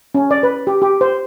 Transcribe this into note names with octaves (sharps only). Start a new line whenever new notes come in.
C#4
D5
B4
G4
G4
C5